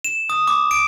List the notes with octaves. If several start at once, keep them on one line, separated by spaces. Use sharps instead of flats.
E7
D#6
D6
D7